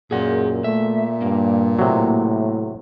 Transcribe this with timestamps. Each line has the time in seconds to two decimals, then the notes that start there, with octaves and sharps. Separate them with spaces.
0.11 F#2 A#2 G#4 F#5
0.64 A3 E5
1.22 G2 A#3
1.79 A2 C3 F#3